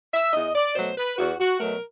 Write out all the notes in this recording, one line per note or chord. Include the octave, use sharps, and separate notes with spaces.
E5
E2 D#5
D5
B2 F#3 A3 C5
B4
E2 F#4
F#4
B2 F#3 A3 A#4